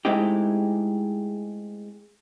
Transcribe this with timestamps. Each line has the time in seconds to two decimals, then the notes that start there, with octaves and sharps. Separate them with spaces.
0.05 G#3 A3 C4 D#4 E4 G4